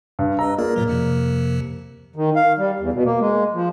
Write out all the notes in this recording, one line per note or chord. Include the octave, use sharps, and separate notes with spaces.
G2
B4 D#5 A#5 E6
A#3 F4 G#4 D5
G2 A#2 F#3
F2 C3 F3
D#3
F5
G3
E2
B2
A#3
G#3
F3